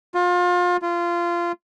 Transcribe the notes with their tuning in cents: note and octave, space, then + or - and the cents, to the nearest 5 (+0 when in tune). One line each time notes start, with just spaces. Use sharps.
F4 +30
F4 -20